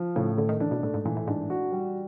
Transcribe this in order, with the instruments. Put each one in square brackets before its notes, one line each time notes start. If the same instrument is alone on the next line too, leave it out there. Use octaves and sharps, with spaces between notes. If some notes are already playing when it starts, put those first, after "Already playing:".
Already playing: [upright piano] F3
[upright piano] A2 [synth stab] C#3
[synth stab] D3 [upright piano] A3
[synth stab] D#3
[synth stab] E3 [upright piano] D4
[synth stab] B2
[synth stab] A2 [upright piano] A3
[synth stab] G#2
[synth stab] A#2 [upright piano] E3
[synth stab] A2
[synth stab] G#2 [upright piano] D4
[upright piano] F#4
G3